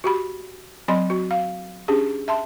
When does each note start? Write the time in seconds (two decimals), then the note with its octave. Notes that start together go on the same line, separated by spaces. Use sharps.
0.04 F#4 G4 B5
0.88 F#3 C4 D#5 B5 C6
1.10 F#4
1.31 F5
1.88 C#4 D4 G4 G#4
2.28 E5 A5 C6